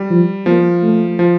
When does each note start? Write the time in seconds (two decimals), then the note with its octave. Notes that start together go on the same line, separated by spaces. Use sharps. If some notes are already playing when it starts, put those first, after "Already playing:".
Already playing: G3
0.10 F3
0.46 F3 A#3
0.83 A3
1.19 F3